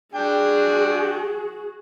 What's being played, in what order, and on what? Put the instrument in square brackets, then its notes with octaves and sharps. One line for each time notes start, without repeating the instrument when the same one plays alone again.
[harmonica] D4 G5 [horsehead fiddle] F#4 G#4